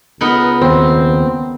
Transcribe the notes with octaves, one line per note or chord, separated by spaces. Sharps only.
C#2 B3 D#4 A#4
D#2 C4